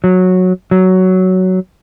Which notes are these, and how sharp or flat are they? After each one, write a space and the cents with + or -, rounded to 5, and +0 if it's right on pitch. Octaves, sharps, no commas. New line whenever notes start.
F#3 -10
F#3 +10